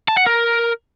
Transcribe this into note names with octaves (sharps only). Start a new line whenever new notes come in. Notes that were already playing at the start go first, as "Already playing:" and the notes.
A5
F#5
A#4